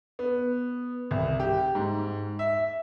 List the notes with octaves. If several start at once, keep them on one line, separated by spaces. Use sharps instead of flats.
B3
C2
G4
G#2
E5